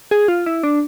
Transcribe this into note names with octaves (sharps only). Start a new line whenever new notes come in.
G#4
F4
E4
D4